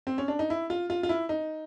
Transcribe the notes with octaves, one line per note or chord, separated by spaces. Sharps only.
C4
C#4
D4
D#4
E4
F4
F4
F4
E4
D#4